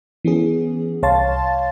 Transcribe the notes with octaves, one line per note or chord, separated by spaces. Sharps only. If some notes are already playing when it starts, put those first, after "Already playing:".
E3 B3 C#4 G#4
C2 C#5 F5 A5 C6 A6